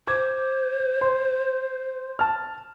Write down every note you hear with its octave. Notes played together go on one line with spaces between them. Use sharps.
C5 D6 G#6
C6
A5 F6